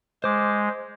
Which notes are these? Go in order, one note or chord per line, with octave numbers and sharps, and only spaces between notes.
G#3 C5 D6